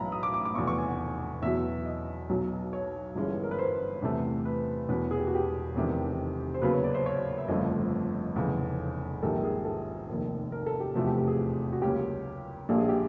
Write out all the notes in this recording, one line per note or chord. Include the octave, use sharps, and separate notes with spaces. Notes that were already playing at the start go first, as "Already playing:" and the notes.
Already playing: B1 A2 E3 A#5 B5
D#6
D6
D6
D6
F1 E2 B2 C#6
C#6
G#5
F#5
E2 B2 F#3 E5
D#5
B1 B2 F#3
C#5
G1 G2 E3 G#3 C#4
A#4
B4
C5
E2 C3 E3 A3
B4
E1 E2 B2 B4
G#4
G4
F#4
G4
F1 E2 C3 D#3
C5
D#2 C#3 F#3 B3 B4
C#5
D5
C5
C#5
D5
E5
G1 F2 C#3 F3 A3 D#5
F1 E2 C#3
A#1 G#2 D#3 G3 A4
G#4
A4
F1 D#2 D#3
A#4
A4
G4
F1 E2 C3 F3 A3 F#4
G4
G4
G#4
F#4
C#2 C#3 F#3 A#3 C#4 G4
A#1 A#2 G3 A#3 D4 A4
G#4
G4